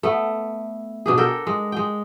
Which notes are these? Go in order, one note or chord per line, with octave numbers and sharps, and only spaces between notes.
A3 B3
B2 D4 G#4
A4 A#4 G5
G#3
G#3 G5